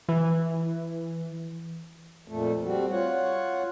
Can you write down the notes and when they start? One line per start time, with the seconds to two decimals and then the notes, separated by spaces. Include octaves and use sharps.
0.09 E3
2.28 F2 A#2 A3
2.65 G3 C4 F#4
2.91 F4 C#5 F#5